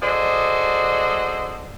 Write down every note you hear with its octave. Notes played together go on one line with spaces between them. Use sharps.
F#4 G#4 A4 C5 D5 D#5